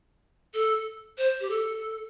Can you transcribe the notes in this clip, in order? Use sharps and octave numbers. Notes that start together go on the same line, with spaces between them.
A4
C5
G4
A4